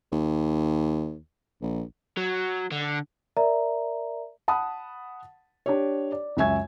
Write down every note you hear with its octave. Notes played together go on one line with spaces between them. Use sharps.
D#2
A#1
F#3
D3
A#4 D5 E5 A#5
F#5 A5 B5 D#6
D4 G4 C#5
D5
C#2 F#2 E5 G#5 C#6 G#6